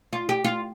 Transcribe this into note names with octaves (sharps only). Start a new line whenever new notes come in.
F4
G4
F4